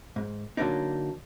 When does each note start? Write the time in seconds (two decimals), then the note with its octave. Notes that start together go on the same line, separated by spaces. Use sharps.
0.16 G#2
0.57 D3 F#3 A#3 D4 D#4